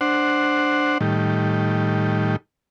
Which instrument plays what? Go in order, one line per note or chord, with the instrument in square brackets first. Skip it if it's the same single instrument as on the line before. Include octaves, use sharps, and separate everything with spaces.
[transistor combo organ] D4 C5 F#5
A2 D#3 G3